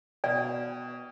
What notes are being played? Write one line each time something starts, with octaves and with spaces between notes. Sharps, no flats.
B2 D5 G5